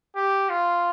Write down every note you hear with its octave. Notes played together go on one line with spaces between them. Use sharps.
G4
F4